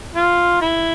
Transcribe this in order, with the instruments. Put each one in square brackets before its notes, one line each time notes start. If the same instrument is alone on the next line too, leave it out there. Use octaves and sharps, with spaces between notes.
[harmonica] F4
E4